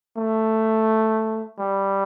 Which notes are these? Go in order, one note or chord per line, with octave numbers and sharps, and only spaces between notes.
A3
G3